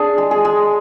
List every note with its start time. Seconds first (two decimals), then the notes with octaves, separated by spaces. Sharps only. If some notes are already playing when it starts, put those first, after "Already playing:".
Already playing: D4 G#4
0.18 G#3
0.31 G#4
0.45 G#3